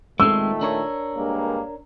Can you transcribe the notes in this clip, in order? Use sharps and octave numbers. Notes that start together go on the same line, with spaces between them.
A#2 D#3 G#3 A3 C4 E6
D4 A#4 C#5
G2 G#3 A#3